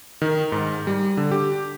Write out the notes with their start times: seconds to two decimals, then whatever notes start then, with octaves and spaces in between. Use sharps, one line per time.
0.22 D#3
0.52 G#2
0.87 G3
1.17 D3
1.31 G4